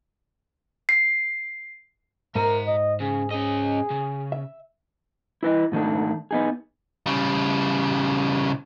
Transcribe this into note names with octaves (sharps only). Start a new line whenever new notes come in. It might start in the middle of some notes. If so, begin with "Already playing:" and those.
C7
G#2 A#4 E5 A#5
D#5
C#3 G#4
C#4 G#4 D#5
C#3
E5
E4 B4 D#5
G#2 D#3 A3 D4
B3 D#4 G#4
C#3 G3